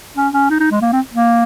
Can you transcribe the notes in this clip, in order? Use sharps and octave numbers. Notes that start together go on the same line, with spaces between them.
C#4
C#4
D#4
D#4
G#3
A#3
C4
A#3